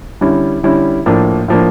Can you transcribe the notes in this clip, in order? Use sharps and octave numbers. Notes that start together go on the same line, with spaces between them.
D3 G3 C#4 E4
D3 G3 C#4 E4
A2 F3 A#3 D4
A2 F3 A#3 D4